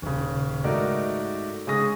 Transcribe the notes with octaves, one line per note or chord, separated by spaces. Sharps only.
D#1 C#3
G#2 A3 D#4 F#4 A#4 D5
C#3 G#3 G#4 C#6 D#6 A#6